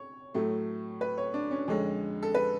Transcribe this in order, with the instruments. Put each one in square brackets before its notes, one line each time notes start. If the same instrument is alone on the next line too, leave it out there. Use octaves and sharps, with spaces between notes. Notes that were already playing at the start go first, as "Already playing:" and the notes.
Already playing: [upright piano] C#5
A2 F#3 A3
B4
C#5
D4
C#4
F2 D3 G#3 C#4
A4
B4